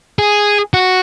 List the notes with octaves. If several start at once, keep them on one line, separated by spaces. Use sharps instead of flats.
G#4
F#4